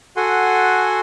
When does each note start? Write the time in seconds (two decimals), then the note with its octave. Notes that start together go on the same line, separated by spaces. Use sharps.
0.17 F#4 A4 F#5 G#5 C6